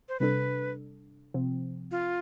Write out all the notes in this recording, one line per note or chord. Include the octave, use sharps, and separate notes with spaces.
C5
C3 G3 D4 A4 B4
C3 F3 C4
F4